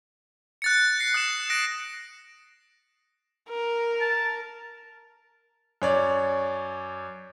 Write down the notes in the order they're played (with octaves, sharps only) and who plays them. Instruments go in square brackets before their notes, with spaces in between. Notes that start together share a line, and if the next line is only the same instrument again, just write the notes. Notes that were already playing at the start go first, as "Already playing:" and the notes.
[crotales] F#6 A6 C#7
A6 A#6 C7
D#6 F#6 E7
F#6 A#6 D7
[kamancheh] A#4
[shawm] A5
[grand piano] F#2 C#5 D5